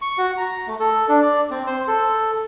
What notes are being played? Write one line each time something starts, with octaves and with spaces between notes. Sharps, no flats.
C#6
F#4
A#5
A3
A4
D4
D5
C4
C5
A4